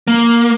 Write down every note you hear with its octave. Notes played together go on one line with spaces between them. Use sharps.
A#3